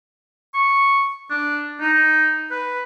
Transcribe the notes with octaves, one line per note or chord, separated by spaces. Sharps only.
C#6
D4
D#4
B4